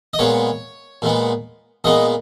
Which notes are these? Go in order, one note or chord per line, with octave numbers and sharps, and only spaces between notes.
D#5
A#2 G#3 B3 C#5
A#2 G#3 B3
A#2 G#3 B3 D#5